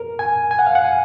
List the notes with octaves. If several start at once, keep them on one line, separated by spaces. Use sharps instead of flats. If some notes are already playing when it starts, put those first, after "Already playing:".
Already playing: A#4
G#5
G#5
F#5
F5
F#5
G#5